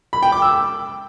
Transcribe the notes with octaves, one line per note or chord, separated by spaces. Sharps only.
B5
G5
D6
E6